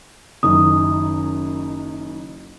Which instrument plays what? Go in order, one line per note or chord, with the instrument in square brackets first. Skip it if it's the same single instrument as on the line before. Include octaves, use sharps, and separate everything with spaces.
[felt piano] F#1 F#2 D#3 [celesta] D#6